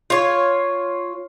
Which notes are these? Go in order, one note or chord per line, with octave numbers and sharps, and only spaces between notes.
F4 C#5